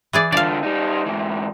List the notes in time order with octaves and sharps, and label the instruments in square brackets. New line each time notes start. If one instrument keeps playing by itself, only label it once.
[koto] E3 G#4 D5
[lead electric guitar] D3 F4 [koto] D5 F5
[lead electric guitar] G3 D#4
G#2 E3